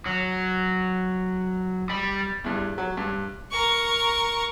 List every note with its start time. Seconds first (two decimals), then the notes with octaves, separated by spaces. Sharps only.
0.06 F#3
1.89 G3
2.44 E2 G2
2.78 F#3
2.97 G2
3.51 A#4 C#6